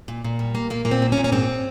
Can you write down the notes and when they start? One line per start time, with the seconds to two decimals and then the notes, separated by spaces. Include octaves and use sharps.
0.08 A#2
0.24 A#2
0.39 G3
0.55 A#3
0.70 A#2 A#3
0.85 A#2 A#3
0.91 C4
1.02 A#3
1.12 C#4
1.17 A#2
1.24 C#4
1.32 G#2 C4